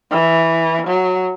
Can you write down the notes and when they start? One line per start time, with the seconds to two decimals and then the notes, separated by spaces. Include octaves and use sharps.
0.11 E3
0.87 F#3